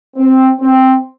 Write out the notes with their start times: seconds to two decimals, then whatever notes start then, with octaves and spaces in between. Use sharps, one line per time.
0.15 C4
0.59 C4